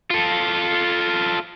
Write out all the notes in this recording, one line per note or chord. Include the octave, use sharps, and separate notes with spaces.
F4 A4